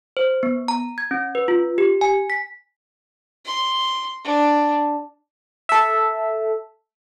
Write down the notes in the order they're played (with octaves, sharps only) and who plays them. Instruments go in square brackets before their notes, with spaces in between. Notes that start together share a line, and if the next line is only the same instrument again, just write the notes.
[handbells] C5
B3
A#5
G#6
C#4
B4
F4
G4
G#5
B6
[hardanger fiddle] C6
D4
[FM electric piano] A4 E5